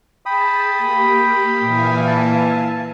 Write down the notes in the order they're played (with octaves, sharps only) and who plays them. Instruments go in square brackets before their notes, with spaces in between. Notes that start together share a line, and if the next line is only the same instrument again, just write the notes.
[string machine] G#4 A5 [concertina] G5 B5 D#6
[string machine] A#3 G4
[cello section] A#2 E3 [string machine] E5 F5 G#5
[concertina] A5